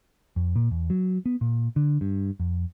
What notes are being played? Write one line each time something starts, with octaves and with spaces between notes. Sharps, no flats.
F2
A#2
E2
F#3
B3
A#2
D3
G2
F2